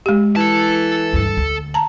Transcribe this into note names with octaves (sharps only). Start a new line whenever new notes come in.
G#3 G4
E3 A4 A5
D2 G2
D2
A5 A#5